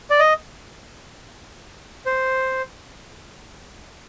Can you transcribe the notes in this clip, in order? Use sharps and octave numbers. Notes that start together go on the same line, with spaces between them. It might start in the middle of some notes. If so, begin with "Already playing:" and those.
D5
D#5
C5